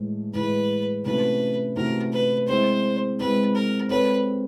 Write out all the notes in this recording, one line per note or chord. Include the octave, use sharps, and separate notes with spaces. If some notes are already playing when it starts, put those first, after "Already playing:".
Already playing: A2 E3 G#3
A2 E3 G#3 B4
C3 E3 A3 C#4 F#4 B4
C3 E3 A3 C#4 F#4 A#4
B4
G#3 C4 E4 C5
G#3 C4 E4 B4
A#4
G#3 C4 F4 A4 B4 C#5